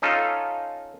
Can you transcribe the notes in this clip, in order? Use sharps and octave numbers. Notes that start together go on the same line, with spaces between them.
C#4 D#4 F4 A4